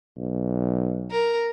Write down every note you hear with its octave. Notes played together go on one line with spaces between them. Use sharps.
B1
A#4